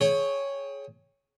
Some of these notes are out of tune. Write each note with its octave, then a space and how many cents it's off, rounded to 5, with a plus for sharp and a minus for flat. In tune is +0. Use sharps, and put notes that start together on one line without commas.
G#4 +20 C#5 +0 G5 +30